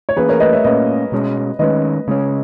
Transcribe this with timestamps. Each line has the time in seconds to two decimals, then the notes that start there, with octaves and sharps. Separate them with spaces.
0.09 C#5
0.16 E3 A#3 C#4 G#4 B4
0.29 A#4 C#5
0.40 B4 D#5
0.52 C#5 E5
0.64 A#2 A#3 C#4 B4 D#5
1.12 B2 G#3 C#4
1.59 D#3 G#3 C#4 B4 D#5
2.08 C#3 G#3 C#4